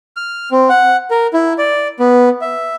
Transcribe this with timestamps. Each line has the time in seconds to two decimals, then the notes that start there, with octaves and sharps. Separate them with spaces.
0.16 F6
0.52 C4
0.69 F#5
1.11 A#4
1.34 E4
1.58 D5
1.99 B3
2.41 E5